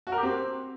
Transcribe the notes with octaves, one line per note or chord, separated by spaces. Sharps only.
F#4
A#4
G4
C4